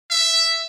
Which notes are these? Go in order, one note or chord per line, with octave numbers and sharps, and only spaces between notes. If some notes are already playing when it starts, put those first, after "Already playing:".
E5